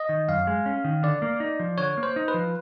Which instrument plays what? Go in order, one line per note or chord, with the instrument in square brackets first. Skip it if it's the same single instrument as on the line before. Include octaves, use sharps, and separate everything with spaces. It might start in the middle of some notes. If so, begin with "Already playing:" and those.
Already playing: [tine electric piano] D#5
[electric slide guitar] D#3
[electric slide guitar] F#2 [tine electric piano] F5
[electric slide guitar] G#3
C#4
D#3
[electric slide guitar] D3 [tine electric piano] D5
[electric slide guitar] A#3
D#4
F3
[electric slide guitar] D3 [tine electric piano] C#5
[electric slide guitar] A#3
[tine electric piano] C5
[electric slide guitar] D#4
[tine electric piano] B4
[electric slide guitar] F3